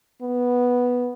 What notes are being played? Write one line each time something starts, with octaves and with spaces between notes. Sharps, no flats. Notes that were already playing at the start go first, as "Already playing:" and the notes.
B3